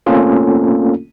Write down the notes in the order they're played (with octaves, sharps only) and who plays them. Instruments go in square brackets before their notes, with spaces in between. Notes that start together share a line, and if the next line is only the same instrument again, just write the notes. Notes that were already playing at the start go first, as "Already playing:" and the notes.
[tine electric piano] A3 A#3 C4 C#4 F4 A4